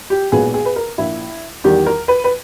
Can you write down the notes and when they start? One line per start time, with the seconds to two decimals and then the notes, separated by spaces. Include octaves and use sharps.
0.10 G4
0.32 B1 A#2 G#3 B3 G#4
0.54 G#4
0.65 B4
0.76 A#4
0.98 A#1 A#2 A#3 E4
1.64 E2 D#3 G3 G4
1.86 A#4
2.08 B4
2.24 B4